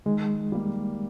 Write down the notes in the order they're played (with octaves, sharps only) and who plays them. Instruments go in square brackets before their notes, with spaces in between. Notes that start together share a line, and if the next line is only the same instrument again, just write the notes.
[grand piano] D#3 [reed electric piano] G#3
[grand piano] G3 A#3